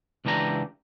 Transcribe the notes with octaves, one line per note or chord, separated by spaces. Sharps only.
C#2 E3 D4 G4 A#5